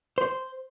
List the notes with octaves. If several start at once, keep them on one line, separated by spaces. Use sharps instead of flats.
C5